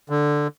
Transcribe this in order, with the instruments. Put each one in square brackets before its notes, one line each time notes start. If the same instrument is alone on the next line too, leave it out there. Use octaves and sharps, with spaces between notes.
[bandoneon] D3